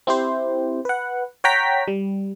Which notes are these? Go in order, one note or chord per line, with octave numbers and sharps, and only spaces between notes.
C4 E4 G4 C5
B4 F#5
C#5 F#5 G5 A#5 B6
G3